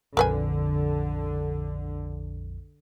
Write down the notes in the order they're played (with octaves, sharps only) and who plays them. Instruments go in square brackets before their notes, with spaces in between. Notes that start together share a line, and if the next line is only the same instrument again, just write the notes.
[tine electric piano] A#1 F2 [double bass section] D3 [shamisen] A#4 B4 G#5